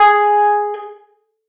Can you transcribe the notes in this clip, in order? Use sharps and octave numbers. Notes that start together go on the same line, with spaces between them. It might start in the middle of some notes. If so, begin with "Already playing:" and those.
Already playing: G#4